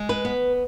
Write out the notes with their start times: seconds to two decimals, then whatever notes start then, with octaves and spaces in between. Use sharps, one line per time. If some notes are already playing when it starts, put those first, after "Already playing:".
Already playing: G#3
0.09 B4
0.25 B3